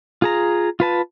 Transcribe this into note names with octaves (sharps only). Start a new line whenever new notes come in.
F4 G#4 A#5
F4 B4 A5